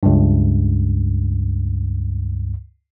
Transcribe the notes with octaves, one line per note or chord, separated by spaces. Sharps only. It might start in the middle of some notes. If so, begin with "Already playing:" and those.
C#2 G2